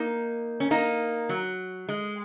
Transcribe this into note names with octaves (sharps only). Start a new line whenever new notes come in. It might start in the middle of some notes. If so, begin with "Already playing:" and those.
Already playing: A#3 D#4
C#4
A#3 D#4
F#3
G#3